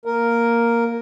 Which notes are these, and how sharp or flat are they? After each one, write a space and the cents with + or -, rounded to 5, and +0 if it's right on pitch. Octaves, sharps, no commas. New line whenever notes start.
A#3 +0 A#4 +0